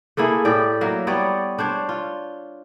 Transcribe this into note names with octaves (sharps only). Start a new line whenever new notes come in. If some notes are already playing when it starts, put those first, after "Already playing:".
A3 A#3 E4 G#4
A2 G4 D5
F#3 A#3 E5
G3 B3 C#5 D5
D4 C5 C#5
F4